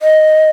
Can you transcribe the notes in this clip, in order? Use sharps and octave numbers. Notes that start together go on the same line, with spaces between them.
D#5